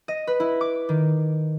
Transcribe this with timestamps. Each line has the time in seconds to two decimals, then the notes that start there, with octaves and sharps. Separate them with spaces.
0.08 D#5
0.27 B4
0.40 E4
0.61 D6
0.89 D#3